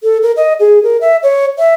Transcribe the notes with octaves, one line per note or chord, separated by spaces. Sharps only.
A4
A#4
D#5
G#4
A#4
E5
C#5
E5